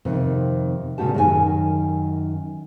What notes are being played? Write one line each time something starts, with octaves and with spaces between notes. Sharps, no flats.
F2 C3 D#3
A#2 C#3 F#4 G4 A5
F#2 D#3 A4 G#5